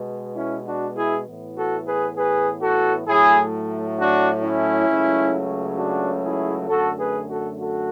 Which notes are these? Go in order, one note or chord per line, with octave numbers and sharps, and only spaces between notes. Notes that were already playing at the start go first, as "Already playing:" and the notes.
Already playing: B2 G#3 B3
C#4 E4
D4 F#4
E4 G#4
A2 E3 B3
F#4 A4
G#4 B4
G#4 B4
F#4 A4
A2 F#3 A3 E4 G#4
D4 F#4
C#4 E4
C#2 C#3 F#3 A3
D4 F#4
E4 G#4
F#2 D3 A3 F#4 A4
G#4 B4
F#4 A4
F#4 A4